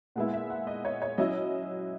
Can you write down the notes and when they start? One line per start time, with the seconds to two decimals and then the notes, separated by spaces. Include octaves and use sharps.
0.16 A#2 G#3 B3 E4 F#5
0.33 E5
0.50 F#5
0.67 D#5
0.85 C#5
1.02 C#5
1.18 F#3 C#4 E4 D#5